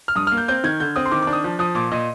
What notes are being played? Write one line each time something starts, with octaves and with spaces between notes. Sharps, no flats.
F6
G2 D#6
A#3 F6
G6
C4 G6
D#3 G#6
D3 G6
C4 D#6
C6
D#3 D6
D6
D4
D#6
F3
F3 D#6
A#2 D6
A#2 D#5